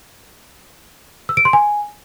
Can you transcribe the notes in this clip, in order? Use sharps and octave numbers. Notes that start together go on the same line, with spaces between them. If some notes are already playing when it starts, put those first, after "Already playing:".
E6
D7
C6
G#5